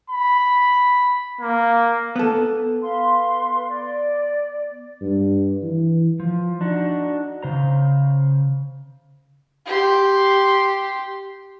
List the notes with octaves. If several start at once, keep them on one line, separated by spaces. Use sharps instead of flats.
B5
A#3
B3 A4
B4 F5 C6
D5
G2
E3
F3
D4 D#4 F#4
C#3 C5 A#5
G4 C6